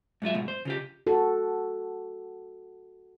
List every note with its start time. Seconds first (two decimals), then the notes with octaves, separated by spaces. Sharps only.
0.22 G#2 F#3 F4 E5
0.34 G#2 B2 F3
0.48 C5
0.65 C#3 F4 G4
1.07 F#4 A4